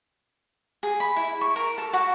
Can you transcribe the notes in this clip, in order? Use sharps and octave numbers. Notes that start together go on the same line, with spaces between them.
G#4
B5
E4
C#6
A#4
A4
F#4